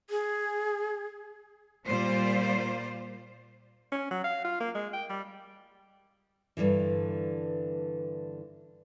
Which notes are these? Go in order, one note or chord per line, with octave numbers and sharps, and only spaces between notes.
G#4
A#2 G3 F4 C5 D5
C#4
F#3
F5
F4
A#3
G#3
G5
G3
G2 A#2 D3 E3